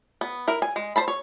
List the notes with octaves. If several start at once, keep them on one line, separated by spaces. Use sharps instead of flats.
B3
E4 A#4
G#5
G#3
C5 A5 B5
C#5